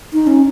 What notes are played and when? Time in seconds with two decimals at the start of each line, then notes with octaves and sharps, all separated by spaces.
0.13 D#4
0.27 C#4